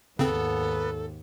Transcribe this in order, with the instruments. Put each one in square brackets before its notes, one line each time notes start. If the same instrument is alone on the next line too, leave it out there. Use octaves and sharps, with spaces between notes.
[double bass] D#2 G#2 [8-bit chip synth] C#3 C4 [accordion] B3 [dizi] A4